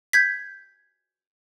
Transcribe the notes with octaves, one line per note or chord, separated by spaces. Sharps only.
G6 G#6 B6